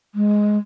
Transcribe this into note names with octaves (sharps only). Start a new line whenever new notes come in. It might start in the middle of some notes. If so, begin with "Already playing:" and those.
G#3